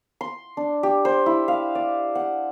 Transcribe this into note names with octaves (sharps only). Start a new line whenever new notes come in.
C6
D4
G4
C5
E4
F5
D5
F#5